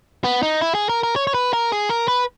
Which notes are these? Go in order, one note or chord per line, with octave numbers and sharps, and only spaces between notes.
B3
D#4
E4
G#4
A#4
A#4
C#5
C#5
B4
A#4
G#4
A#4
B4